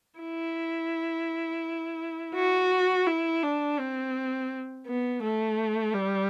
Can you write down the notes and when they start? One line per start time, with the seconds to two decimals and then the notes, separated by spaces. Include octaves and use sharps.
0.19 E4
2.35 F#4
3.07 E4
3.43 D4
3.79 C4
4.87 B3
5.23 A3
5.94 G3